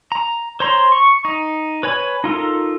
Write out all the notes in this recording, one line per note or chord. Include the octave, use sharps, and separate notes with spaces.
A#5
C5 C#5 A#5 C6
C#6
D#4
B4 C#5 G#5 B5
D#4 F4 A4 A#4